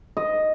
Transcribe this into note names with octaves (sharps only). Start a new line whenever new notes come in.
D#5